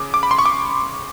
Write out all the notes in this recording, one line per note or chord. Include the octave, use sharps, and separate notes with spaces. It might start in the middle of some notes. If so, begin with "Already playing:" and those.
Already playing: C#3 D6
D6
B5
C6
C#6
D6